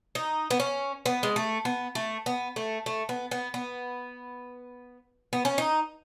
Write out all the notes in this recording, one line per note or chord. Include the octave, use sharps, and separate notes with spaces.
D#4
B3
C#4
B3
G#3
A3
B3
A3
B3
A3
A3
B3
B3
B3
B3
C#4
D#4